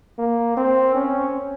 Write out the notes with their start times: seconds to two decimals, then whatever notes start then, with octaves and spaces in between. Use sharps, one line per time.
0.19 A#3
0.57 C4
0.94 C#4